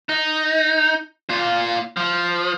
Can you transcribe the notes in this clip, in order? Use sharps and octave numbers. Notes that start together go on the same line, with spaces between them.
D#4
A#2 F4
F3